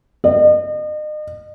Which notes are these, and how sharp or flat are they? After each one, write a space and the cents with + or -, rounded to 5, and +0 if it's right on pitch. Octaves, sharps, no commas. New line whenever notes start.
D#5 -40